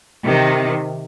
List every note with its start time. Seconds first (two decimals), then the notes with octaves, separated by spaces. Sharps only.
0.23 C3 D#3